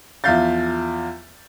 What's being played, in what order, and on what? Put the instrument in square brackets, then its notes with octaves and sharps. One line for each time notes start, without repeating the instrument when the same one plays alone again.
[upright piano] E2 F3 E5 F5 G6 A6